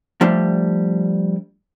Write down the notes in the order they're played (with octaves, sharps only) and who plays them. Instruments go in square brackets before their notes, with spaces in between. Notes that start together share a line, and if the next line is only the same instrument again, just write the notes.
[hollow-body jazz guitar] F3 G3 A3 D4